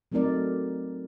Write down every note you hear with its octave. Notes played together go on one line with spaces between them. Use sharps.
F#3 A3 C4 D#4 A#4 D5